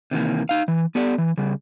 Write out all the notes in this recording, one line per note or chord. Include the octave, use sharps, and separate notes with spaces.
C3 D#3 E3 A#3
D#4 F5
E3
B3 G4 A4 D5
E3
C#3 G3